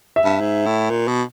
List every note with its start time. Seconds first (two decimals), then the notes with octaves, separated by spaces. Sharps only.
0.16 E5
0.24 G2
0.41 G#2
0.66 A2
0.90 A#2
1.08 B2